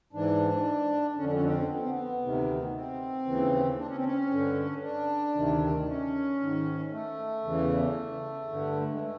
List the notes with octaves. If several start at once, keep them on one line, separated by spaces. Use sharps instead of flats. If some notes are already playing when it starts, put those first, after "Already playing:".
G#2 E3 D4
F2 D3 C#4
D4
C#4
C4
B3
C4
B3
D2 C3 D#3
C4
D#2 C#3 E3
D4
C#4
C4
C#4
G2 D3
D4
D2 C3 D#3
C#4
G#2 D#3
A3
E2 C#3 E3
G2 D3
G#3
A3